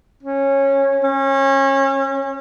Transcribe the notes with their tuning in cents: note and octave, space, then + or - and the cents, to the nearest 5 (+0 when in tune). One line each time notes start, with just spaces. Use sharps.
C#4 -15
C#4 -30